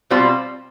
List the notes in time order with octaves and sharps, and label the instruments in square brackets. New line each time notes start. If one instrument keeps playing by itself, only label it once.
[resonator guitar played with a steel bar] B2 G3 C4 F4